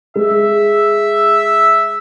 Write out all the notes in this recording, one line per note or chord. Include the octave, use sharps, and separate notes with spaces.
G#3 E5